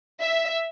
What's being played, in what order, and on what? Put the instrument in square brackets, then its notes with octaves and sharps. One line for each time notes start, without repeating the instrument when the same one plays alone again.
[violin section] E5